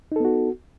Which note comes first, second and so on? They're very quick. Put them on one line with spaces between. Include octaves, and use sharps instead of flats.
D#4 A4 B3 F#4